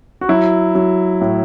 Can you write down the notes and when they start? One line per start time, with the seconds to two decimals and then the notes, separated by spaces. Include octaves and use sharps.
0.21 F#4
0.29 F#3 E4
0.75 F#3
1.21 A2